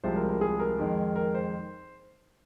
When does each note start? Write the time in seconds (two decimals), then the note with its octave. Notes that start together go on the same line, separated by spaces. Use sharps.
0.03 C2 C3 F3 G#3 C5
0.16 A#4
0.29 A#4
0.41 G#4
0.59 A#4
0.79 F2 D#3 G#3
1.16 A#4
1.34 C5